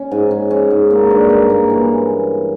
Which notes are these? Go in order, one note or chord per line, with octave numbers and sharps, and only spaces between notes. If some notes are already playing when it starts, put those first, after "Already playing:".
Already playing: C#4
G#2
C#4
C#4
G#2
A#3
G2
A#3
A#3
E3